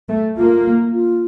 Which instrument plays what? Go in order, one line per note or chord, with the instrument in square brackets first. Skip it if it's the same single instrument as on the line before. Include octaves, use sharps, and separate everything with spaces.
[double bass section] A3
[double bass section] A#3 [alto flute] F4
[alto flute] F4